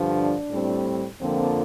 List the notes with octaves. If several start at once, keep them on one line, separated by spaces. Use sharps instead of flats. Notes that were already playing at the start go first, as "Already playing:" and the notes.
Already playing: G2 D3 F3
D4
A2 G3 C4
F2 D3 F3 A#3 C4